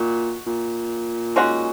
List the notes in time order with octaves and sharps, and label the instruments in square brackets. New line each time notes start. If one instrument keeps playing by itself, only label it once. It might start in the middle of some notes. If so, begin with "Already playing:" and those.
Already playing: [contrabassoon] A#2 [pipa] D#3 F#4
[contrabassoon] A#2
[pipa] D#3 G#3 C#4 F#4